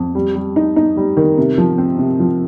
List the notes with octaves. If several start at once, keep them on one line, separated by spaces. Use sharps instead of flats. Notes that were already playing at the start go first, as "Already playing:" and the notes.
Already playing: F2
G3
G3
D#4
D#4
G3
D#3
C3
F3
C4
C3
F3